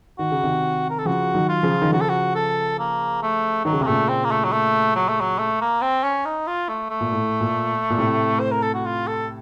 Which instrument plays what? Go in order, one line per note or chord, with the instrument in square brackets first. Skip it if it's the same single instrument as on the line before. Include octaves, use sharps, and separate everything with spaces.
[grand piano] D#3 [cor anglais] F#4
[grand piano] C#3
C3 D#3
[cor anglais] A#4
A4
[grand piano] C#3 F3 [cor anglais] F#4
[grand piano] D#3 F#3
[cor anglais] F4
[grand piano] C#3 F3
D#3
[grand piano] C#3 F3 [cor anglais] F#4
[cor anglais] A4
F#4
A4
A#3
A3
[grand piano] D#3 [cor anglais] F#3
[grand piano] C#3
[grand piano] C3 [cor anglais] A#3
[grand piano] A#2 C#3 [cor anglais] A3
[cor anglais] C4
A#3
A3
F#3
A3
F#3
A3
F#3
A3
A#3
C4
C#4
D#4
F4
A3
A3
[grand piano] A#2
A2
A#2
A#2
A2 C3
[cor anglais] C5
A#4
A4
F#4
F4
A4